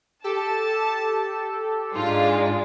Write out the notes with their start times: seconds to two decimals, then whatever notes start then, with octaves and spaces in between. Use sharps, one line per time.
0.24 G4 A4 A5
1.95 G#2 G#3 D4 D#4 F4